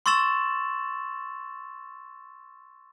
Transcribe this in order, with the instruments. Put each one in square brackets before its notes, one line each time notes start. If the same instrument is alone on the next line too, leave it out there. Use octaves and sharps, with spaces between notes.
[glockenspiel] C6 C#6 E6 A6 E7 F#7